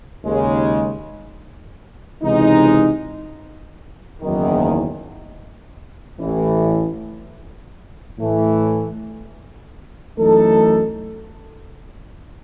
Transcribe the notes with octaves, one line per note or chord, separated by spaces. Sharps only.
D#2 C#3 G#3
C#2 C3 E3 G#3 D#4
F#1 E2 D#3
A1 A2 E3
A2 E3 A3
F#2 E3 A3 D#4 A4